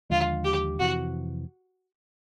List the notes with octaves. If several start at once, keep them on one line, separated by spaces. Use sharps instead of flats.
D#2 D3 F3 G#3 F4
G4
F2 C3 E3 F#4